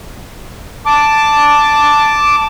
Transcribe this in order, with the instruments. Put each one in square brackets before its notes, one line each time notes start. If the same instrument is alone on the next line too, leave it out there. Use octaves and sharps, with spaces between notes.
[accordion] A5 D6